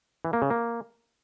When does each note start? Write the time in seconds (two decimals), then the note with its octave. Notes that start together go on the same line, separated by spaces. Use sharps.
0.25 E3
0.33 A#3
0.42 C#3
0.50 A#3